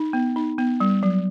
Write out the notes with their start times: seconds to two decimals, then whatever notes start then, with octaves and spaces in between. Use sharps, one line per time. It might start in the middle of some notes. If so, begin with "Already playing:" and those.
Already playing: D#4
0.13 B3
0.36 D#4
0.58 B3
0.80 G3
1.03 F#3